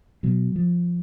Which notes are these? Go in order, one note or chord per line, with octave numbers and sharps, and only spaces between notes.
B2 F#3
F3